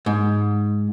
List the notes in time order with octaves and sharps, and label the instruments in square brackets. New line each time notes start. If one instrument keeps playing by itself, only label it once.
[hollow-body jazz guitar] G#2